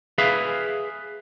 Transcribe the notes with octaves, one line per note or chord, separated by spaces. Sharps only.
G#4 B4 E5 F5